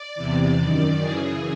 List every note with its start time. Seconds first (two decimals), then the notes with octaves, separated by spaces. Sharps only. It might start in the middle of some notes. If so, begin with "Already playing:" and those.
Already playing: D5
0.15 E2 C3 E3
0.59 F#2 D#3
1.02 F#2 C#3 E3 G#4